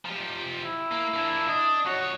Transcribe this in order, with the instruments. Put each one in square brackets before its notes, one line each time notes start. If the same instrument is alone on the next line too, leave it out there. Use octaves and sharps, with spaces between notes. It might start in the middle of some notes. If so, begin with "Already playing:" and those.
[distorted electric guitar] F3 G4
[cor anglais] E4
[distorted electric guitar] A#3
A#3 D4
[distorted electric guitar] D4 [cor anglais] D#5
[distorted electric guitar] F2 C#5 [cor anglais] F#4